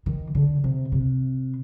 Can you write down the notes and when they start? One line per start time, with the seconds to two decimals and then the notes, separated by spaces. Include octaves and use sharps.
0.06 D#3
0.35 D3
0.64 C3
0.92 C3